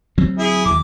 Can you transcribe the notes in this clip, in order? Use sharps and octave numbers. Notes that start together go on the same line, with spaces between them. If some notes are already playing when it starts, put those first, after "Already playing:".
D2 F#3 C4
E4 G#4
D#2 C#3 F#3 D6